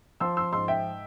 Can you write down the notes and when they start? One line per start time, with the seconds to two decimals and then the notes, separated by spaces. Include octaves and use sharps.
0.20 F3 C6 E6
0.37 C6 E6
0.52 G#2 C6 E6
0.68 E5 G5